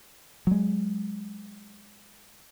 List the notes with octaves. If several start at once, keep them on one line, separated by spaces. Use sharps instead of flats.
F#3 G#3